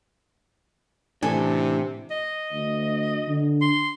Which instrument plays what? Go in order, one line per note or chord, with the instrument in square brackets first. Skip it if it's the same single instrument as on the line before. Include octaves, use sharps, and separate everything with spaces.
[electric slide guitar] A2 E3 [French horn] C3 [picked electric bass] D4 [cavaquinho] A4 G#5
[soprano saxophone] D#5
[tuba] D2
D3
[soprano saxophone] C6